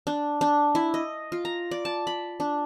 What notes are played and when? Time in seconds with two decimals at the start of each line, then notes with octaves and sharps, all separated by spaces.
0.07 D4
0.41 D4
0.75 E4
0.94 D#5
1.32 F4
1.45 A#5
1.71 D5
1.85 A5
2.07 B5
2.40 D4